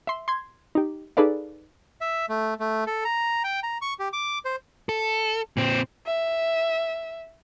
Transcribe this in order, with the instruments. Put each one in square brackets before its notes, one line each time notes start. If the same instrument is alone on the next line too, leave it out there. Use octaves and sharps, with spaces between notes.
[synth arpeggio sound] E5 C6
C6 G#6
D#4 G4
D#4 G#4 A4 B4 D5 F5
[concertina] E5
A3
A3
A4
A#5
G5
A#5
C#6
G4
D6
C5
[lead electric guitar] A4
A#2 C4
[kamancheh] E5